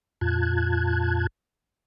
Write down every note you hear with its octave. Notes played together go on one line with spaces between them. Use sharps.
F2 A#2 F4 A5 F#6 G#6